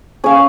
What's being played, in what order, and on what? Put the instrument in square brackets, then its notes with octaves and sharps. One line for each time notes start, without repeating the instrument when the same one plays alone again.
[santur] C#4 G#4 C#5 F5